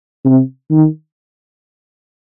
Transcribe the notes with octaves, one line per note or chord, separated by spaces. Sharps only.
C3
D#3